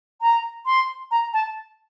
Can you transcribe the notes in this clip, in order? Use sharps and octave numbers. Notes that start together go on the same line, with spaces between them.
A#5
C6
A#5
A5